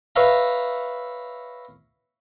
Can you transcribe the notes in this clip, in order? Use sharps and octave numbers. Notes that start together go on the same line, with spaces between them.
B4 C#5 E5 F5 A#5